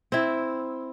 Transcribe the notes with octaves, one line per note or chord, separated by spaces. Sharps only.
C4 E4